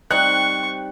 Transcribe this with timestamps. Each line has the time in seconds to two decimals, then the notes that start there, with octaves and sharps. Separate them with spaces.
0.11 G3 C4 D#4 C#6 F#6